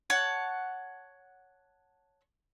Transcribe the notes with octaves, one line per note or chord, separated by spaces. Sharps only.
C#5 F#5 A5